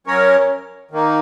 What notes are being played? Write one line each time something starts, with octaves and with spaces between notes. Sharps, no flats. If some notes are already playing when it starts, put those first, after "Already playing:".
F#2 F#3 C#4 A#4 C#5
D#3 A#3 D#4